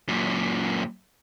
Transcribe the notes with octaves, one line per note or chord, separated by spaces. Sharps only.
F#2 A#2